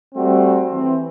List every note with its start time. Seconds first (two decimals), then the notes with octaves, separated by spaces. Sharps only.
0.15 G3 A3 C4 F#4
0.71 E3 C4